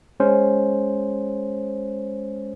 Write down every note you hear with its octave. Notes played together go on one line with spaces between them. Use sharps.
G#3 C#4 C5